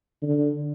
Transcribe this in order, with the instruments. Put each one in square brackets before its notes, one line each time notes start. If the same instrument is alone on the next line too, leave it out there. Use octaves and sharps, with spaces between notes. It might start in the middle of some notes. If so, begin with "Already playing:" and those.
[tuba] D3